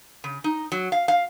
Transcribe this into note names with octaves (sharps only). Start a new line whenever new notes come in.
C#3
D#4
F#3
F5
F5